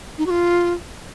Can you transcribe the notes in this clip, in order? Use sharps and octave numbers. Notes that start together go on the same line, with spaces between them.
D#4
F#4
F4